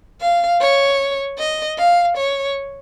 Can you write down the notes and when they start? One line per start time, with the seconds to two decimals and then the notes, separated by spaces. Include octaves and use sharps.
0.21 F5
0.61 C#5
1.38 D#5
1.78 F5
2.17 C#5